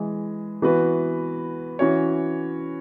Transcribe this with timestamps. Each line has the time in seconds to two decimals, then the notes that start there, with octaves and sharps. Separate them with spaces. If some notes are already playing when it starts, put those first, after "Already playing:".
Already playing: E3 G#3 G#4
0.62 E3 B3 F#4 B4
1.79 E3 C#4 F#4 C#5